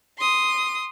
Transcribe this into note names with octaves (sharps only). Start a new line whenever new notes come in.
C6 D#6